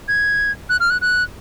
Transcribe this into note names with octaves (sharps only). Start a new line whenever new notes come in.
G#6
F#6
F6
F#6
F#6